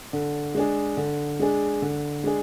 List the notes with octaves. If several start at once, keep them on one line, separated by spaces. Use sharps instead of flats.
D3
G#3 D4 G#4
D3
G#3 D4 G#4
D3
G#3 D4 G#4